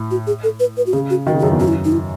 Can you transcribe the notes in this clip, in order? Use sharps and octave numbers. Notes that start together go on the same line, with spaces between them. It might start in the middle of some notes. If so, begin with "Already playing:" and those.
Already playing: A2
F#4
G#4
A4
B4
B4
F#4
C#3 G#4
F#4
D#3 F#4
C#3
F#4
F#2 G#4
E2
F#2 F#4
E4
D#4
E4